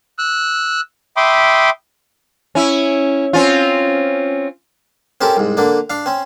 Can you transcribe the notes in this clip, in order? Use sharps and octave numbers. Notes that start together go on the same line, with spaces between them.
E6 F#6
E5 G5 B5 C6 D6 D#6
C#4 E4
C4 C#4 F4
C4 C#4 G4 A4 A#4
C2 G#2
D3 A#3 D4
D4 F5
C4 C#4